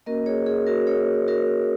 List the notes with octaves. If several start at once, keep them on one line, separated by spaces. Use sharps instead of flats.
A#3 C#4 F#4 A#4 D#5
G#4 C#5
G#4
F#4 A#4
G#4 C#5
F#4 A#4